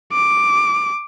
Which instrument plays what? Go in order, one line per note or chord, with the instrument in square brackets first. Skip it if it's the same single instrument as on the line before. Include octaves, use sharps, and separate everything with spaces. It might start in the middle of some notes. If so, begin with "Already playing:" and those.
[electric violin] D6